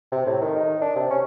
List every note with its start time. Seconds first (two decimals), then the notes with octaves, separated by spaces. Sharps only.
0.12 C3
0.26 A2
0.41 D#3
0.56 D#4
0.81 D4
0.96 C3
1.10 C#4